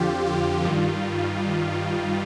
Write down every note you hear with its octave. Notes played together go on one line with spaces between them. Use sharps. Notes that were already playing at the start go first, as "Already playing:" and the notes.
Already playing: F2 D3 F3 F4 G4
F4
G2 D#3 G3